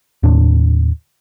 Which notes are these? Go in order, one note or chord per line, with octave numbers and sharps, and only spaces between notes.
D#2 A2 D4